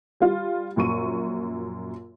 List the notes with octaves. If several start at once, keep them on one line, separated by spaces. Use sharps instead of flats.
G3 F4
A#1 F#2 C#6 D#7